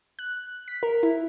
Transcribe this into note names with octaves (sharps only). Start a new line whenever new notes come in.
F#6
B6
A#4
E4